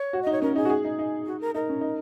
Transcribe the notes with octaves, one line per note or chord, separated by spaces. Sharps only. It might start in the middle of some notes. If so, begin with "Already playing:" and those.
Already playing: C#5
F#4
D#4 D#5
C#5
C#4 A#4
D#4 G#4
F#4
G#4
D#4
D#4
F#4
A#4
D#4 A#4
C#4
D#4